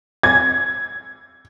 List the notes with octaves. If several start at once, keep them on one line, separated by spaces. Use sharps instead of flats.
G#6